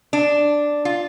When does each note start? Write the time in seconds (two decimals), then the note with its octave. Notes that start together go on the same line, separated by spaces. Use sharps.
0.13 D4
0.85 F4